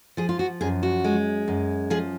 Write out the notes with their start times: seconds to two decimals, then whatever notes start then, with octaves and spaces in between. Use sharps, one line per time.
0.17 F3 G#4
0.29 F4
0.39 F#4
0.61 F#2 G#4
0.83 F#4
1.04 G#3
1.48 F#2
1.90 F3 G#4